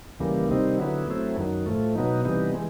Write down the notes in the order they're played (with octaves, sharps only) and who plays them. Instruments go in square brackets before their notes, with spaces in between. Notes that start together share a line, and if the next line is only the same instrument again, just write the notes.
[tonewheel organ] D#2 C#3 E3 G3 A#3
C3 D#3 G3 C4 D#4
D3 F#3 B3 E4
F#3 A3 C4 E4
F#2 D#3 F#3
A2 F3 A3
B2 F#3 B3 D#4
C3 E3 G3 B3 D#4
E3 G#3